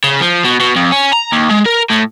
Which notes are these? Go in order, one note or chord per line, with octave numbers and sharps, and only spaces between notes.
C#3
F3
B2
B2
F2
C#4
A#5
D#2
G#3
A#4
A2